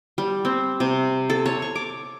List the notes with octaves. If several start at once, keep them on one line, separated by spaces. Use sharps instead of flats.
G3
C4
C3
A4
C#5
C#6
D6